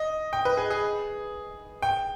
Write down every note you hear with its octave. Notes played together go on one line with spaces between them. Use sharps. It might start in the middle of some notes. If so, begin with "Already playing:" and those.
Already playing: D#5
G5
B4
G#4
G#4
G5